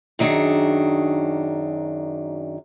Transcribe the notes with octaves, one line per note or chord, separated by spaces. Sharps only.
F#2 D#3 D4 F#4 G#4